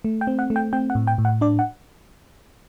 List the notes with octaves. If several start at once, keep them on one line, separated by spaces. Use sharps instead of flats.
A3
G5
C4
F#5
A3
G5
C4 G5
F#5
A2
G5
A2
F#5
D4 D5
F#5